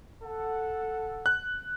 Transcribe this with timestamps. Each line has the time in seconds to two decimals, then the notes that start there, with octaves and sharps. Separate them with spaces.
0.24 A4 F#5
1.26 F#6